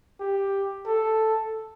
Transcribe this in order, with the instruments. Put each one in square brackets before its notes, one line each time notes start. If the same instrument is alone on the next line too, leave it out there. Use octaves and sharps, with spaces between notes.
[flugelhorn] G4
A4